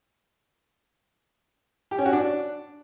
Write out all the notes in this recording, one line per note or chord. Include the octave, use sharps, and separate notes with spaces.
G4
C#4
F#4
D4